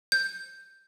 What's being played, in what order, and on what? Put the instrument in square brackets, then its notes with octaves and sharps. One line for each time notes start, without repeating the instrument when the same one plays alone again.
[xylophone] G6